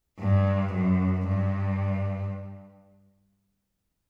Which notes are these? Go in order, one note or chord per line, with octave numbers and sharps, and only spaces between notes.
G2
F#2
G2